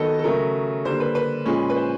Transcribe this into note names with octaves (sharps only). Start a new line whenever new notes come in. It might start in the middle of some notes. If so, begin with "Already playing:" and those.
Already playing: D#3 F#3 B3 A4 D#5
A4
C#3 F#3 A3 A#4
D3 G3 A#3 D4 C5
B4
B4
A#2 F3 G#3 C#4
B4
C5